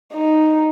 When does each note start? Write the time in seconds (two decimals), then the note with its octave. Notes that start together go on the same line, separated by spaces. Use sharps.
0.13 D#4